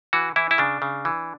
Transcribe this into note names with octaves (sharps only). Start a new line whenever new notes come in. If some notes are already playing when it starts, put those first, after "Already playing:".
E3 F#4
E3 E4
E4
C#3 D4
C#3
E3